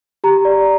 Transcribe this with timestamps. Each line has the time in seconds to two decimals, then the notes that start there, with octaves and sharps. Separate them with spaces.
0.24 G4 A#5
0.45 D5